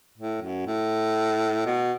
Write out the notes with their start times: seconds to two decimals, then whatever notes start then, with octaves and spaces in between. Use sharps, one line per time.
0.18 A2
0.42 F#2
0.67 A2
1.66 B2